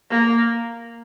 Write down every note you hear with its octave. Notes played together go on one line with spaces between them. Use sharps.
A#3